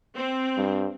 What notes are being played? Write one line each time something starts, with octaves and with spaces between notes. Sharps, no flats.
C4
G2